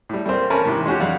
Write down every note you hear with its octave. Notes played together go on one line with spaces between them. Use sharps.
A2 G3
G3 A#3 C4
C#4 A#4 G#5 A5 B5
G#2 C3 E3
G#3 C#4 F#4 G4
F2 G3 F5 F#5